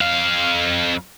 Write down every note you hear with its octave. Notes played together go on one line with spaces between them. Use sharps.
F2 F5